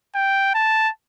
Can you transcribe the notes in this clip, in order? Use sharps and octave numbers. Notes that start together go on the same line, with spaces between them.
G5
A5